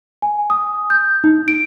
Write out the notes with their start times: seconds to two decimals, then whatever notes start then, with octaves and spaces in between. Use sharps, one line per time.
0.22 G#5
0.50 D#6
0.90 G6
1.24 D#4
1.48 D7